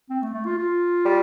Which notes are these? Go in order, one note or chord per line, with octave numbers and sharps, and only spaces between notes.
C4
A3
A3
F4
F4
G3